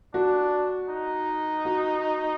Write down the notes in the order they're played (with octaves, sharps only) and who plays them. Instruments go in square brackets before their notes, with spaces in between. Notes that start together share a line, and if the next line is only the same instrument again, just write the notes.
[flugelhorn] D4 [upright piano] F#4
[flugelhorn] D#4
[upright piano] F#4